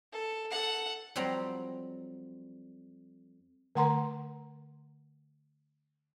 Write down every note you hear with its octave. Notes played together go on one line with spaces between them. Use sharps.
A4
A4 F#5
F2 F#3 G3 C4 A#5
D3 A3 A#4 F#5 A#5 C6